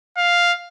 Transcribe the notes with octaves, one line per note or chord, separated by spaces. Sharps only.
F5